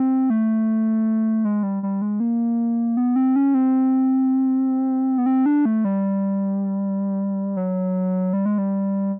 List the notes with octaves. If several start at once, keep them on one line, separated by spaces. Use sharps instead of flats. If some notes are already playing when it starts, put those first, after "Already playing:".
Already playing: C4
A3
G#3
G3
G3
G#3
A#3
B3
C4
C#4
C4
B3
C4
D4
A3
G3
F#3
G3
G#3
G3